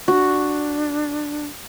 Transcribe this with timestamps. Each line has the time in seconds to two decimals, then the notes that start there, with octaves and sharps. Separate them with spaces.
0.08 D4 F#4